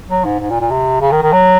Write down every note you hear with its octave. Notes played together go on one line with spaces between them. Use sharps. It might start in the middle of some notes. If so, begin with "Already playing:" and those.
F#3
G#2
G#2
A#2
A#2
C3
C#3
D#3
D#3
F#3